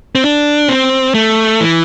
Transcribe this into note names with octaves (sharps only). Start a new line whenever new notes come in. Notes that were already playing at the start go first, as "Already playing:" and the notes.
C4
D4
C4
A3
E3